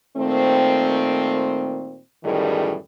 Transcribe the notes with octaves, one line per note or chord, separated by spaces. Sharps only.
A#2 D#3 A3 C4
F#2 A2 D#3 E3 G3 G#4